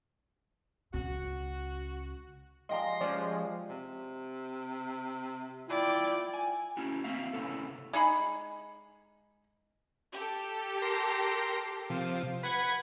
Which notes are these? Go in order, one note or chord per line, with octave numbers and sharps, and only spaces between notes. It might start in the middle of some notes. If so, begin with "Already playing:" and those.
C#2 C#3 F#4
F3 G#3 G4 D#5 G5 A#5 C6 A#6
F3 G#3 C#4 D5
C3
E4 F4 D5 G5
G#5
C#4 E4 F#4
A#3 C4 E5 F5
C3 G3 B3 C#4 E4 A4
G#3 D#4 G#4 B5
G4 A4
A#4 C6
C3 F3
B4 F#5 B5 G#6